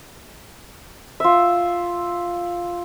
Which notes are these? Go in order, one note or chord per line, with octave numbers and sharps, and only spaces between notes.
F4 E5